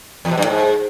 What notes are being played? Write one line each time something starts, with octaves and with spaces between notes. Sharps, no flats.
E2
B2
G2
A2
G#2